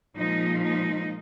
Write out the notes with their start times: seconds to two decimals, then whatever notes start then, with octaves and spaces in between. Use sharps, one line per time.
0.17 A#2 F3 G#3 D#4
0.63 D#4